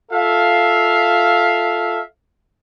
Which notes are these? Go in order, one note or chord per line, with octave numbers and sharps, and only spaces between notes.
F4 A4 E5 F5